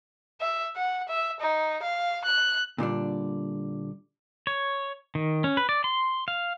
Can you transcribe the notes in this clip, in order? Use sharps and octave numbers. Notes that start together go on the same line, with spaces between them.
E5
F#5
E5
D#4
F5
F#6
A#2 D3 G3 D4
C#5
D#3
C#4
B4
D5
C6
F5